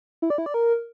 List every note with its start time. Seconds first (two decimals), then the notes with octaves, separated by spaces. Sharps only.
0.22 E4
0.30 D5
0.38 E4
0.46 D5
0.54 A#4